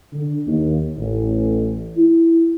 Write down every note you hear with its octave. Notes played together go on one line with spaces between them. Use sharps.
D3
D#2
A1
E4